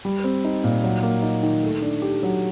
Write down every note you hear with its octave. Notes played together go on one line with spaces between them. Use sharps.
G3
C4
D#4
A#2
F#3
A#3
D#4
D#3
A3
D4
G4
F#3